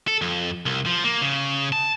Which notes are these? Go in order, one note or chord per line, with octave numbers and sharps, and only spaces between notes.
A4
F2
C2
F3
A#3
C#3
A5